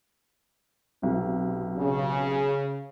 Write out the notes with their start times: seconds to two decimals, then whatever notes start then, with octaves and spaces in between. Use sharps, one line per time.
1.02 B1 C3
1.78 C#3